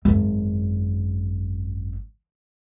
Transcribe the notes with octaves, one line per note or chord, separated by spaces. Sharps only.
G#1 F#2